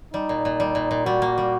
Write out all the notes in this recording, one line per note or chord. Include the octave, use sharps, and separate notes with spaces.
G3 D#4
A#2
A#2
G3
A#2
A#2
G3 F#4
A#3
G3